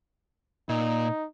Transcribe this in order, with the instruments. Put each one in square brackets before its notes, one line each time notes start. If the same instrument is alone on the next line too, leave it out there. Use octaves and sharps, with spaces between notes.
[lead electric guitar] A#2 [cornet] D#4